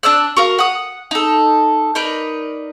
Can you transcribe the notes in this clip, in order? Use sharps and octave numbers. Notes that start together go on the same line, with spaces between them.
D4 D5 E6 F#6
F#4 A#4 F5
F#5 D#6
D#4 A4
D#4 A#4 B4 D5